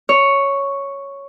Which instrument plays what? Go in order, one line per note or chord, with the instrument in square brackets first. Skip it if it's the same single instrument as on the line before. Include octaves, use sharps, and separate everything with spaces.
[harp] C#5